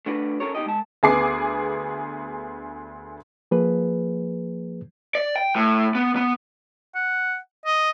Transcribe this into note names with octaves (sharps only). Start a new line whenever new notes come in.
A3 D4 F#4 B4
C#4 A4 A#4 C#5
B2 D#4 G4 D#5
G#3 A5
D2 B3 G#4 G#5 D6 C7
F3 A#3 G#4 B4
D5
G5
A2
B3
B3
F#5
D#5